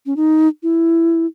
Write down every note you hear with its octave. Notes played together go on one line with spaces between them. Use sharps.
C#4
D#4
E4